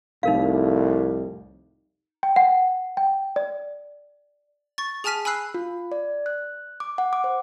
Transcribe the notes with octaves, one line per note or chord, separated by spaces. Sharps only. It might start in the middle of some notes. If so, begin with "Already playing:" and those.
C2 F2 A2 D#4 A#4 F5
G5
F#5
G5
D5
C#6 A6
G#4 G#5 A5 F6 B6 D#7
G#5 B5 E6 F#6 C7
F4
D5
F#6
D6
F#5
D6
C5